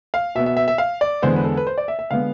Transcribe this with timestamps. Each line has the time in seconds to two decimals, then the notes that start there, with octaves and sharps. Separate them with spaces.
0.14 F5
0.35 B2 E5
0.39 B3
0.46 E5
0.57 E5
0.68 E5
0.78 F5
1.01 D5
1.22 E2 D3 G#3 B3 C5
1.36 B4
1.44 A4
1.57 B4
1.67 C5
1.78 D5
1.88 E5
1.99 E5
2.11 D3 G#3 B3 F5